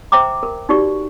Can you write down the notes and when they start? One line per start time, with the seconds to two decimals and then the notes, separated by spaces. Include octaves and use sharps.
0.12 C5 E5 G5 A#5 D6
0.43 A#4
0.69 D#4 F#4 G4 D5 C#6